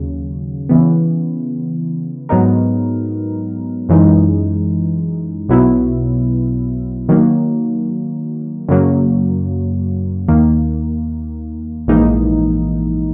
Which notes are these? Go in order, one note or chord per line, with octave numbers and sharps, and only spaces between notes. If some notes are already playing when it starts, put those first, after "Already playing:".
Already playing: D#2 C#3 F#3
C#3 E3 B3
G#2 F#3 B3 D#4 A#4
F#2 E3 G#3 D#4
B1 B2 F#3 B3 E4
D#3 F#3 A#3
F#2 C#3 F#3 A#3
D#2 D#3 A#3
A#1 G#2 E3 A#3 D#4